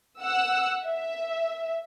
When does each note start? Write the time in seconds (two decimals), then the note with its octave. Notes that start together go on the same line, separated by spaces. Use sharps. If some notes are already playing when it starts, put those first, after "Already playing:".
0.20 F#5 E6
0.85 E5